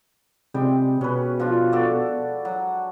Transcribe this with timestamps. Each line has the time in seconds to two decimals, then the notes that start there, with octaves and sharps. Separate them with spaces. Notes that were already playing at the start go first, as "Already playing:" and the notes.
0.54 C3 G3 G#3 G5
1.01 B2 C#4 B4
1.40 F3 D4 F4
1.72 F#4 A4 D5
2.45 F#3